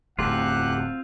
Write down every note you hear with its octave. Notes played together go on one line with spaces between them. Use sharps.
D1 E2 A3 C4 F4 G4 F#5 F#6